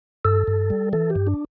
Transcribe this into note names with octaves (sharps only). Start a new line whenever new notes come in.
G2 A4
G2
G3
E3 A4
G4
G2
D4